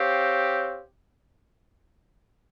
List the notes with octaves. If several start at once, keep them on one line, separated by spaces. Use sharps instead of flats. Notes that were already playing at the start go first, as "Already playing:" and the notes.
Already playing: C4 G4 C#5 F5